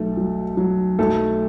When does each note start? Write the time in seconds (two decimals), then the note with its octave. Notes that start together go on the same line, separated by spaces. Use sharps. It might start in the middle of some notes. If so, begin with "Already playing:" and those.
Already playing: B1 A3 A4
0.17 F#3
0.57 F#3
0.99 B1 A3 A4